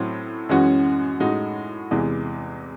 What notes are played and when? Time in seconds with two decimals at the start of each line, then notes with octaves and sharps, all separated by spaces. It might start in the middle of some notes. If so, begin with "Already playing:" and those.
Already playing: A2 F#3 C4 E4
0.49 F#2 E3 G#3 C#4 F#4
1.20 A2 G#3 D#4 F#4
1.91 E2 C3 E3 G#3